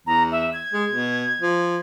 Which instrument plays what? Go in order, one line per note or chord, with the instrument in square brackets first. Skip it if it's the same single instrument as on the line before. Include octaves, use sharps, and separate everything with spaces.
[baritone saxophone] E2 [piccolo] A#5
[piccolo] E5
G#6
[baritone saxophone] G#3
B2
F3